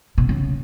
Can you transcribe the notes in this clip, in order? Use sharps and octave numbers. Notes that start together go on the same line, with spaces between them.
B2
C#3